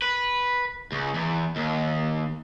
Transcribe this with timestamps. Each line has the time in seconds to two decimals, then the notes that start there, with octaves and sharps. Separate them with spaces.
0.02 B4
0.92 C#2
1.14 E2
1.56 D#2